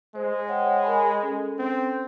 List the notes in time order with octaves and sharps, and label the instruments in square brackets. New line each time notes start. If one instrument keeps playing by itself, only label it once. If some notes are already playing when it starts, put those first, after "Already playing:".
[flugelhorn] G#3 [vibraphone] C5
[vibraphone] C#5 F#5 G5
A#4 G#5 B5
C#4 A4
[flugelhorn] C4